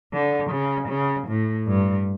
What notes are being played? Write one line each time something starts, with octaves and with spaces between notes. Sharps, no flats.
D3
C#3
C#3
A2
G2